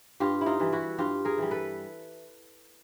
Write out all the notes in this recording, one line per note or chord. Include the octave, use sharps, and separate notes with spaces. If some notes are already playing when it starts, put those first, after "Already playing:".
G2 F4 G4
E4
D#4 F4
E3 G3
E4 F#4
G2 F4 G4
G#4 A#4
E3 G3
A4 B4